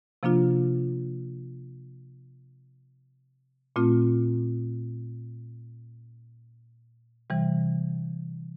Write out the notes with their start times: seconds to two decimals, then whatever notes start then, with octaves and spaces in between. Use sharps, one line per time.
0.23 C3 F3 A#3 D4 F4
3.76 A#2 A3 C4 F4
7.30 C3 E3 G3